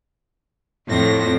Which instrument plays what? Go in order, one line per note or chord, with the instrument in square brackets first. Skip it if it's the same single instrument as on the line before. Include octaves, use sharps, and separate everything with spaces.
[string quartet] F2 A#6 [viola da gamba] A2